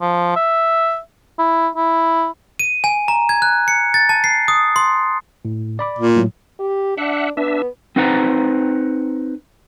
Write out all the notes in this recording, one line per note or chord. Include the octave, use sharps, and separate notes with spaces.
F3
E5
E4
E4
D#7
G#5
A#5
G#6
F#6
C#7
A6
A5
C7
D#6
C6
A2
D5 B5 D6
A#2
A2 F#3
G4
D4 E5 F#5
B3 D4 E5
C4 D#4 B4 C5 F#5 A#5